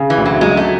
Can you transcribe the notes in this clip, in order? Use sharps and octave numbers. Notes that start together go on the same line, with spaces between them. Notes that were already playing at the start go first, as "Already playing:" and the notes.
Already playing: C#3
E3
D2
F#3
F#3 G#3
A3